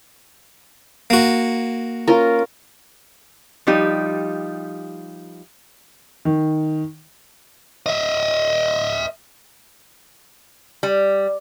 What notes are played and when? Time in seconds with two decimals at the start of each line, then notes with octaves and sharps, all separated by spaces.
1.10 A#3 F#4
2.08 C#4 F4 A#4
3.67 F3 G3 D#4 G4
6.25 D#3
7.86 D#5 E5
10.83 G3